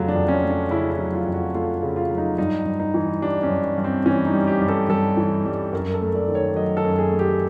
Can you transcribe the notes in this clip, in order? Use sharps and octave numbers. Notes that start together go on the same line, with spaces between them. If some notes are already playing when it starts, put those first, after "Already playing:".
Already playing: F2 C#3 F#3 A3 F4
D4
F2
C#4
A3
D4
C#3 E4
E4
F#3
F4
F2
F#4
A3 F4
C#3
F4
F#3
D#4
G2 D#4
G2
D#4
E3
G3 D4
C#4
G2
G2
C4
E3 C#4
D#4
G3
G4
G2
A4
G2 A4
E3
G3
F#2 A#4
A4
A3
D5
D#3
C#5
F#3 D#5
A4
F#2
G#4
A3
G4